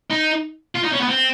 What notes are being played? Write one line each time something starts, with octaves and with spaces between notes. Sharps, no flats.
D#4
F4
D#4
C#4
B3
C4